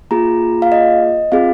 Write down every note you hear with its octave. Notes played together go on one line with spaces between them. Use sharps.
A#3 F4 G#4 A#5
F5
D#5
C4 F4 G#4 F5